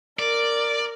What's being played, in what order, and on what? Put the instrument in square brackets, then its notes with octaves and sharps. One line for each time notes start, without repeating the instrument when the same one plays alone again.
[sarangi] A#4 [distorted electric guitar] D5